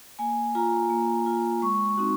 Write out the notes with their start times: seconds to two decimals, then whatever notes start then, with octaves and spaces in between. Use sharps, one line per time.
0.19 A#3 G#5
0.55 F4 A#5
0.90 A#3
1.26 F4
1.62 G#3 C#6
1.97 C4 D#4 F#4